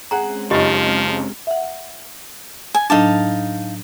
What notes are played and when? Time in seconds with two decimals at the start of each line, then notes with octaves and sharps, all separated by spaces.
0.11 G#3 C4 C#4 G#4 F#5 A#5
0.51 F#1 F#2 F3 D#4 F4 G4 D#5
1.47 E5 F#5
2.75 G#5
2.90 A2 F#3 D4 D#4 F5 A5